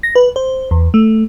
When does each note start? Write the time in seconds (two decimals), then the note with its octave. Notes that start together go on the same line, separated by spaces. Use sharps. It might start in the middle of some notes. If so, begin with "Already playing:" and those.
0.03 A#6
0.15 B4
0.36 C5
0.71 E2
0.94 A3